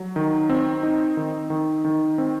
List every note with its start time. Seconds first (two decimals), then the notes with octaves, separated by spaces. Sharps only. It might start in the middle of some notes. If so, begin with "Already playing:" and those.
Already playing: F#3
0.16 D#3
0.49 C4
0.83 D#4
1.17 D#3
1.50 D#3
1.85 D#3
2.18 C4